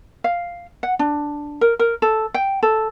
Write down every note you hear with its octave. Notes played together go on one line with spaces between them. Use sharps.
F5
F#5
D4
A#4
A#4
A4
G5
A4